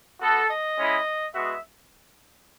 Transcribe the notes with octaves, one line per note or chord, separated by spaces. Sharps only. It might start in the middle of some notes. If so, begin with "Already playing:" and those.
B3 F#4 A4
D#5
G#3 C#4 E4
G#3 B3 F#4 E5